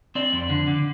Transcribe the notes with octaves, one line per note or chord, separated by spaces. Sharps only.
C4 D5
F2
D3
D3